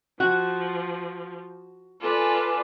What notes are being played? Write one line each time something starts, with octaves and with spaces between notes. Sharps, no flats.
F3 F#4
F4 A4 B4 D5 G#5 D6